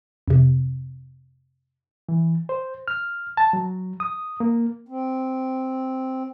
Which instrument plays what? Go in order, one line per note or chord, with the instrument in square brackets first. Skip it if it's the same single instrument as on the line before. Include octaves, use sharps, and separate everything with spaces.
[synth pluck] F2 C3
[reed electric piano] E3
C5
F6
A5
F#3
D#6
A#3
[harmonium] C4